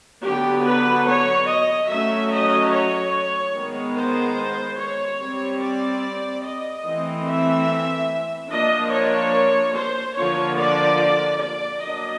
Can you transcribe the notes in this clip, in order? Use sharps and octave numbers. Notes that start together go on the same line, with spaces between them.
D3 F#3 B3 D4 G4
B4
C#5
D#5
F#3 A3 C#4 E5
D#5
C#5
D#3 G#3 B3
C5
C#5
G3 C4
D5
D#5
E3 A3 C4
E5
F3 A#3 D4 D#5
C#5
C5
D3 F3 A#3 C#5
D5
D5
F#3 A#3 D4 D#5